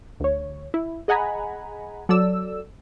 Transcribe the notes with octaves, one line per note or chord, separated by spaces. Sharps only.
D2 C#5
E4
G#4 D#5 F#5 G#5 A#5 B5
F#3 A4 D5 E6